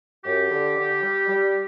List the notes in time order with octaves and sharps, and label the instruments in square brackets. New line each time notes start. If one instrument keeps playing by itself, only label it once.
[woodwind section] F#2 G4
D3
D3
G3
G3